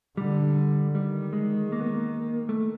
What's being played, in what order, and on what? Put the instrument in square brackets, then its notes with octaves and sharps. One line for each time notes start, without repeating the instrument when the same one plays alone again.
[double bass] D3 [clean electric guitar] G3
[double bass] D#3 [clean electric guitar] G3
[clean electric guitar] G#3
A#3
B3
A#3
A3